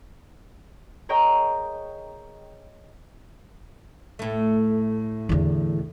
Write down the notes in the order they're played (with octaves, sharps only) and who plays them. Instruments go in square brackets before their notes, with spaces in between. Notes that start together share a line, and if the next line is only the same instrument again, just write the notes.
[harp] G#4 A#4 C#5 D#5 G5
[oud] A2 A3
[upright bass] E2 D3